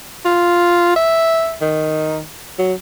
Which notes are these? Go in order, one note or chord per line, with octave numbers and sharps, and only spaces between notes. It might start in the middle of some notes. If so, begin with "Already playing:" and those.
F4
E5
D#3
F#3